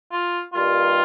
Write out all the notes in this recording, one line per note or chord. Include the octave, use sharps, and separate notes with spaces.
F4
G2 D#3 G3 A#3 F4